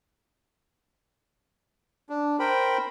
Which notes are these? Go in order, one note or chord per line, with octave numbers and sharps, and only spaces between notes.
D4
A#4 C5 G5 B5